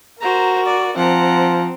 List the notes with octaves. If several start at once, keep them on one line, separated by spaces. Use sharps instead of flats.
F#4 A#4 C5 A#5
D5
F3 C4 F#5 A#5